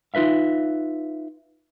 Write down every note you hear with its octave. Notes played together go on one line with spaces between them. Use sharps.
D#4 F4 B4 E5 F5